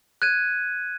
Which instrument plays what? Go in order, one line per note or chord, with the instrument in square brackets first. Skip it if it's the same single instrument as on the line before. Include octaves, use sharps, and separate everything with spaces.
[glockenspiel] F#6 G#6 D#7